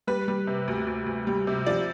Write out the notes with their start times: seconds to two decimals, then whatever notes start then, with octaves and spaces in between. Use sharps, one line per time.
0.07 G3 B4
0.28 G3
0.47 C3
0.68 D2
0.87 D2
1.06 D2
1.27 G3
1.47 C3
1.66 F3 D5